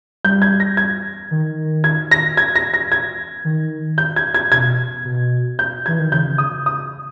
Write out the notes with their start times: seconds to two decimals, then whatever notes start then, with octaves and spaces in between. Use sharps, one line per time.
0.25 G3 G6
0.42 G#6
0.60 A#6
0.77 G#6
1.31 D#3
1.84 G#6
2.11 A#6
2.37 G#6
2.56 A#6
2.74 A#6
2.92 G#6
3.45 D#3
3.98 G6
4.16 G#6
4.34 G#6
4.52 B2 G#6
5.05 B2
5.59 G6
5.86 E3 G#6
6.00 D#3
6.12 C#3 G6
6.38 D#6
6.66 D#6